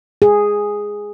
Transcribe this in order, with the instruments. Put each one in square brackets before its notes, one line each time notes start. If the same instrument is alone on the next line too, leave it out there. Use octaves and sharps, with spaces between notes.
[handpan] G#4